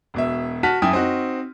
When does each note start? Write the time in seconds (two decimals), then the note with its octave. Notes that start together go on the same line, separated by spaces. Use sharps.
0.14 E1 B2 E5
0.63 F#4 A5 F6 B6 D#7
0.82 F#2 E4 G5 G#5 D#6
0.93 C4 D#4 F#4